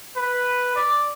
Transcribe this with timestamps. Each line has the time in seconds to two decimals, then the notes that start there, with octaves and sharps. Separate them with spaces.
0.16 B4
0.75 D5